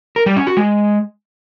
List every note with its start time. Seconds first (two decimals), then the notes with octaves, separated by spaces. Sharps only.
0.16 A#4
0.26 G3
0.36 C#4
0.47 F#4
0.57 G#3